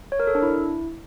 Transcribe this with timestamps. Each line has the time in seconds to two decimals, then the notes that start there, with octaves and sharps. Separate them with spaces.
0.12 C#5
0.20 A#4
0.27 A4
0.35 D4
0.42 E4